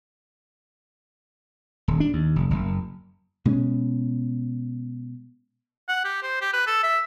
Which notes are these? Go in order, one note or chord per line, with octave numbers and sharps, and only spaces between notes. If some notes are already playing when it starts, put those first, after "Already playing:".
D#1
D4
D#2
F1
F#1
B2 G#3 C4 C#4
F#5
G4
C5
G4
B4
A4
E5